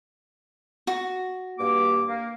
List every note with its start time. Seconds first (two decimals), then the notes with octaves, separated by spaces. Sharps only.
0.87 F#4
1.58 G2 A#3 D6
2.08 A#3